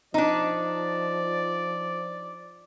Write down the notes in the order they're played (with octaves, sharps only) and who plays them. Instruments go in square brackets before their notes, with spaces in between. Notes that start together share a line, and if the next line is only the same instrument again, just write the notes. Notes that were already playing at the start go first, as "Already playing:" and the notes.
[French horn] F3 [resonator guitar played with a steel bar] D4 D#4 [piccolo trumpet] D5